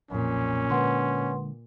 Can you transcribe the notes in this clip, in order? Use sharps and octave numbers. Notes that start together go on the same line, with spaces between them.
B1 F2 A#2 C#4
D3 G#3 B4 F#5 C6